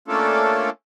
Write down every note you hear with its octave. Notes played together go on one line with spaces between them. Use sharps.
A3 A#3 C#4 D4 F4 A4